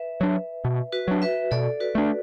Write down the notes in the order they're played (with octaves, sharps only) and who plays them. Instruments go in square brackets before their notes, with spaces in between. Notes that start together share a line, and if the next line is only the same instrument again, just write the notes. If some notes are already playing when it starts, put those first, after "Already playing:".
Already playing: [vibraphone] B4 E5
[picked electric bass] F#3 D4
B2
[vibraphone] F#4 B4
[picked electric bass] F#3 D4
[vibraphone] B4 E5
[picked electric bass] B2 [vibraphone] A4 D5
[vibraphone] F#4 B4
[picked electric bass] A3 D4